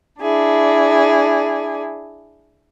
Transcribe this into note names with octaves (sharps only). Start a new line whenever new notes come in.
D4 E4 G#4